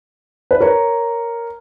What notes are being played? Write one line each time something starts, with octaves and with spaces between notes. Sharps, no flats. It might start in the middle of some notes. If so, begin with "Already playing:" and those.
B4
A#4 C#5